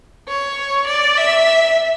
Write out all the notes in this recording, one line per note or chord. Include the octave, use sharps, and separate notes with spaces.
C#5
D5
E5